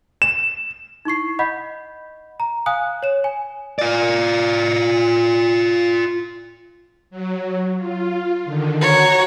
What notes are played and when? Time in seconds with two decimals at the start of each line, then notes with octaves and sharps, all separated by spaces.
0.22 E7
1.05 D#4 E4 C#6 C7
1.39 D#5 F#5 B5 G6 B6
2.40 A#5
2.66 F5 G#5 D#6 F#6
3.03 C#5 E7
3.24 G#5
3.79 F4 D5
7.11 F#3
7.77 F4
8.45 D3 D#3
8.81 F#4 C#5 A#5